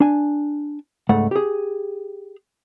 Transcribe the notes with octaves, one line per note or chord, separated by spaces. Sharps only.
D4 G#5
C#2 G#2 A3 F#5
G4 G#4